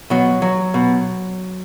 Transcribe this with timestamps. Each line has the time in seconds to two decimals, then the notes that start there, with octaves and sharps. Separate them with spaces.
0.10 B2 F#3
0.42 F#3
0.74 B2